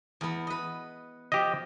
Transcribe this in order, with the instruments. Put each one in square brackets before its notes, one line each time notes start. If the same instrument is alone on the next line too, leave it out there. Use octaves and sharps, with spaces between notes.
[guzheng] E2 B3
B4 D#5
[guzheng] F3 [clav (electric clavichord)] G4 D#5